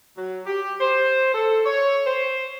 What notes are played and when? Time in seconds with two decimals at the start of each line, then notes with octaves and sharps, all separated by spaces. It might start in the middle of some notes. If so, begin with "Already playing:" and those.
0.17 F#3
0.47 G4
0.81 C5
1.34 A4
1.65 C#5
2.06 C5